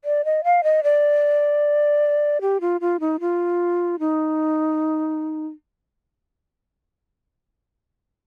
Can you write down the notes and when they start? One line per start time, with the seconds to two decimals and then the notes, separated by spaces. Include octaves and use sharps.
0.05 D5
0.25 D#5
0.44 F5
0.64 D#5
0.83 D5
2.41 G4
2.61 F4
2.81 F4
3.00 D#4
3.20 F4
3.99 D#4